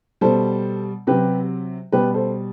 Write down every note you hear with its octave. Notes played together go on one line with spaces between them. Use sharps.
B2 G3 A4 C5
C3 F#3 G4 B4
B2 G3 G4 B4
A4 C5